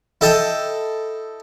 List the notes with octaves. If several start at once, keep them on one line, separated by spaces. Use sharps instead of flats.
E4 A4 D#5 G5 A5